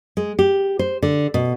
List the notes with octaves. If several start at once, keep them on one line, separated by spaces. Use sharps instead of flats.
G#3
G4
C5
D3
B2